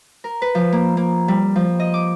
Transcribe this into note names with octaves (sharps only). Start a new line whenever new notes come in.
A#4
B4
F3
A#3
A#3
G3
F3
D#5
D6